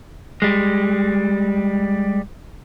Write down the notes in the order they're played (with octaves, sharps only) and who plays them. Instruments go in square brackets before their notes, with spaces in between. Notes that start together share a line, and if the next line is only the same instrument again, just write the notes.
[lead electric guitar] G3 G#3